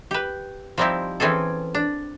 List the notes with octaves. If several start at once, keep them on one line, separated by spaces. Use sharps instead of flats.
G4 B4
F3 G3 C4 D#4 E4 G4
E3 C4 C#4 G#4 A4
D4